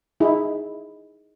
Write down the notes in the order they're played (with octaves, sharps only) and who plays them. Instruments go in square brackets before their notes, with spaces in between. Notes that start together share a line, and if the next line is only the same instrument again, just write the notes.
[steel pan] D#4 E4 G#4